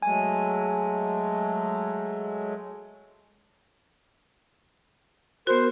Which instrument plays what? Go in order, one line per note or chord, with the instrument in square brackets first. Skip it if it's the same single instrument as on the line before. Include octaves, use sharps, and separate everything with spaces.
[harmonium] F#3 G#3 A3 [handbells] G#5
[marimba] B3 F#4 [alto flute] A#4 [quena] C5